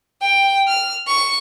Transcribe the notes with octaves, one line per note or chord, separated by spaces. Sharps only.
G5
F6
C#6